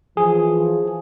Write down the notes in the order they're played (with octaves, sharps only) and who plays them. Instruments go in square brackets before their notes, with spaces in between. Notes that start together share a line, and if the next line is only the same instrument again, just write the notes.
[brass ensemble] E3 F3 [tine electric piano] G#4